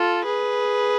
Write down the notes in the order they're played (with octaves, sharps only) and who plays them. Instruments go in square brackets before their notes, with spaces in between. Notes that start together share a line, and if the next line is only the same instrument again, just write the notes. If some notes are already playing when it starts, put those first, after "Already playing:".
Already playing: [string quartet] F4 A4
G#4 B4